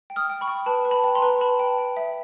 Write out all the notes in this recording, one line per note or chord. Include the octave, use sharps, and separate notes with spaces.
G5
D#6 F6
G5
B5 C#6
G5
B4 A5 B5
B4
A5 B5
G5
A#5 C6
B4
B4 A5 B5
G5
G5
E5